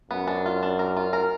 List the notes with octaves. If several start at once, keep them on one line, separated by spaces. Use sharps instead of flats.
F#2 B3
D4
F4
D4
A#4
F4
A#4